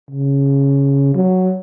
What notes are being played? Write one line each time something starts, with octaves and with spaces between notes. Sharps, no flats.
C#3
F#3